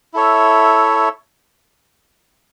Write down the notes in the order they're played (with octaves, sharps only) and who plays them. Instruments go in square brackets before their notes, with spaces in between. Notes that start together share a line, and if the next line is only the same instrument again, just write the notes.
[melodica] E4 A4 C#5 E5